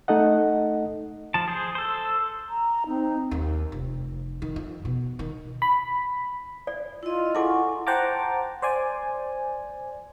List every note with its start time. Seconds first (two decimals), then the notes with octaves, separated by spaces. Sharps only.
0.08 A3 D#4 A4 D#5 F#5
1.34 F3 A5
1.48 G#4 C5
1.75 A4 C5
2.49 A#5
2.86 C4 D#4
3.31 D#2
3.72 F1
4.42 D#3
4.56 F2
4.85 B2
5.19 D#3
5.62 B5
6.67 D5
7.03 E4 F4 D#5
7.35 E4 G#4 A4 F#5 G#5 C#6
7.87 C5 F#5 G5 A5 A#5 D6
8.62 C5 D5 G#5